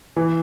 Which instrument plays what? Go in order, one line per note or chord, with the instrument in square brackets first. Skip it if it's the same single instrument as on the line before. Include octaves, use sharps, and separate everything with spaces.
[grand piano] E3